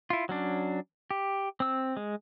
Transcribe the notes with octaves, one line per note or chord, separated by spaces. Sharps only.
E4 F4
F#3 C#4 D4
G4
C4 E6
G#3